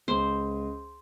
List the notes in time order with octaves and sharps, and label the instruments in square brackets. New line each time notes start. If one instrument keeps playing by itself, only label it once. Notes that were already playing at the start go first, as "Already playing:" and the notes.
[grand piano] C#2 [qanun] C5